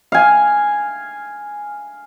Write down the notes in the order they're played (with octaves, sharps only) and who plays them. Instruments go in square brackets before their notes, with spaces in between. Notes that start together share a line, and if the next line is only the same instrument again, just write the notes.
[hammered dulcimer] F5 G#5